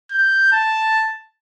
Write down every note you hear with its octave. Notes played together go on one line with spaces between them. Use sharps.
G6
A5